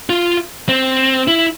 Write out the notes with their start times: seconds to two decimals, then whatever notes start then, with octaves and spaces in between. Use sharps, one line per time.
0.09 F4
0.69 C4
1.28 E4